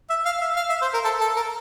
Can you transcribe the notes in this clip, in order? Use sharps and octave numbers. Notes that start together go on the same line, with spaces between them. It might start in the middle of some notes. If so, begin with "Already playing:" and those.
E5
F5
E5
F5
E5
C5
A#4
A4
A4
A#4